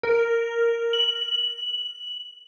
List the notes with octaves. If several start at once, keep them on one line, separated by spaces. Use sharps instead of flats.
A#4
F#7